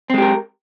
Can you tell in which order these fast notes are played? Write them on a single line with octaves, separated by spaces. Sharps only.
C4 G#3 G4 A#4